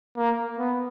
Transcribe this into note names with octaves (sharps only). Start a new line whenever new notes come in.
A#3
B3